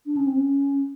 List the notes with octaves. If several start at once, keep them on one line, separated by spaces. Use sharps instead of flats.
D4
C#4
C4
C#4